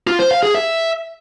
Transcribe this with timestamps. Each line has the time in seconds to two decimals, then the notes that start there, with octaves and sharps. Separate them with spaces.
0.07 F4
0.19 C5
0.31 F5
0.43 G#4
0.55 E5